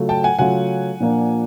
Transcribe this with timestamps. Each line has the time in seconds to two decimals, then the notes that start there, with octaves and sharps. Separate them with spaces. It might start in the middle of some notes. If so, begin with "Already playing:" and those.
Already playing: C#3 F#3 A3 C#4 F4
0.09 G5 A5
0.24 F#5 G#5
0.39 C#3 F#3 A3 C#4 F4 F#5 G#5
1.00 A#2 F3 A#3 D4